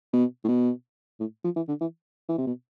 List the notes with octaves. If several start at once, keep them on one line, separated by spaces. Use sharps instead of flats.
B2
A2
B2
A2
F3
E3
D3
E3
E3
C3
B2